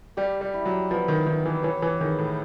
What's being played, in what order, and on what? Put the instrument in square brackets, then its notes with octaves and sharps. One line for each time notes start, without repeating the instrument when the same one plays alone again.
[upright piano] G3 [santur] G4
[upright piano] G3
[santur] E4
[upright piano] F#3
[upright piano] F3 [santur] B3
[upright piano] D#3
[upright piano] D#3 [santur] E4
[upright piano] E3
[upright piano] E3 [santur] C#5
[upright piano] E3
[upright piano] D#3 [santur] G#4
[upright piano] A2